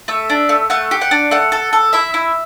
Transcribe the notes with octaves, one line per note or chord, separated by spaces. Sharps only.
A3 E5
D4
A3
A3 F#5
G4
F#5
D4
A3 F#5
A4
A4
E4 E5
E4